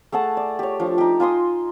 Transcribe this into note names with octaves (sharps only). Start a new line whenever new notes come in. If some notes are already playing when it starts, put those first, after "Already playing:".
A3 G#4 F#5 A5
D5
G4 C#5
F3 D4
D#4 G4
F4 G#5 C6 D#6